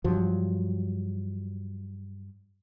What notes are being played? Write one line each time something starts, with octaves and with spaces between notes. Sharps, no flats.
G2 F3 F#3